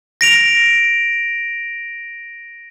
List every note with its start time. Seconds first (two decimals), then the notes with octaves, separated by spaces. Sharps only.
0.21 A#6 D7 F7